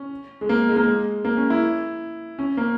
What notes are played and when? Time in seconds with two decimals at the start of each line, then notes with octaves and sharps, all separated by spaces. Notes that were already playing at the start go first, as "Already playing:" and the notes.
Already playing: C#4
0.41 G#3
0.49 A#3
0.68 G#3
0.77 A#3
0.85 G#3
1.25 A#3
1.37 C#4
1.50 E4
2.39 C#4
2.57 A#3